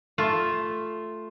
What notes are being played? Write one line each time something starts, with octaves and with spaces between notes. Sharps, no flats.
A3 F4